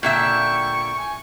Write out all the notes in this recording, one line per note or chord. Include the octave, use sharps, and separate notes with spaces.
A#2 D3 E5 G5 C#6
G#5